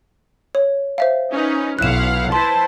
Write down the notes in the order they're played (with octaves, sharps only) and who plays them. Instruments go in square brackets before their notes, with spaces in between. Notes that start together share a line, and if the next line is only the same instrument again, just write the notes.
[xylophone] C#5
C5 E5 F5
[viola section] C#4 D#4 B4
[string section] B1 [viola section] E4 F5 F#5 [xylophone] F#6 E7
[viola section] E4 B4 C5 [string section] A5 [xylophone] C6